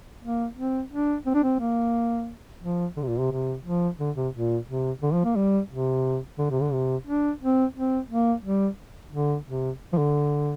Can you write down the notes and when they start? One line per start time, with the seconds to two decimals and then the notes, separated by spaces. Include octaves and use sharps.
0.23 A#3
0.58 C4
0.92 D4
1.26 C4
1.34 D4
1.44 C4
1.60 A#3
2.63 F3
2.97 D3
3.03 C3
3.08 A#2
3.19 C3
3.31 C3
3.65 F3
3.99 D3
4.16 C3
4.34 A#2
4.68 C3
5.02 D3
5.13 F3
5.25 A#3
5.36 G3
5.70 C3
6.39 D3
6.50 C3
6.61 D3
6.73 C3
7.07 D4
7.41 C4
7.76 C4
8.10 A#3
8.44 G3
9.12 D3
9.47 C3
9.93 F3
9.98 D3